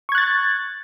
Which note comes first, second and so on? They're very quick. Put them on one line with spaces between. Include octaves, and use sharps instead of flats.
C#6 G#6 F#6 A6